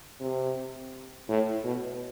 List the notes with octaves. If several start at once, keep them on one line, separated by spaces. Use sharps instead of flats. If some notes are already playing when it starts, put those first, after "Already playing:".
C3
A2
B2